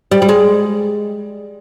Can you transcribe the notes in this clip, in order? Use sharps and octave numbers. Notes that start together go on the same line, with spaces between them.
G3
G3
G#3